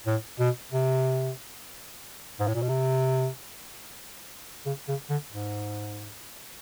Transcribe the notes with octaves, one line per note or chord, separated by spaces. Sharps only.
A2
B2
C3
G#2
A2
A#2
B2
C3
C#3
C#3
D3
G#2